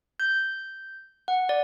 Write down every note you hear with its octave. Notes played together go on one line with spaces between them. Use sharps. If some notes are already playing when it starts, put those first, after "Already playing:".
G6
F#5
D5